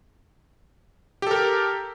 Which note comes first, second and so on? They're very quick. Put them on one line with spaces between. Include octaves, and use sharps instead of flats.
G4 A4 A#4